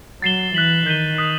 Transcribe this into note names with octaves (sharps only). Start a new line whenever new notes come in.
F#3 A6 C7 E7 G7
E3 F#6 B6 F#7
D#3 G6 B6 D#7 G7
D#6 F#6 B6